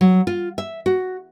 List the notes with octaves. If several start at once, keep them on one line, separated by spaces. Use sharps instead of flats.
F#3
F4
E5
F#4